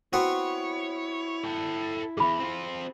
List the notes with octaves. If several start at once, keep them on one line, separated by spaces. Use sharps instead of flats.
B3 C4 E4 F#4 C#5
A4 G5
E2 G#2 G#4 B5
C4 F4